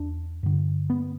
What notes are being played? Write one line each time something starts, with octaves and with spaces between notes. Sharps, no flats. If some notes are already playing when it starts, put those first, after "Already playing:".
Already playing: E2 D4
G2 D3
B3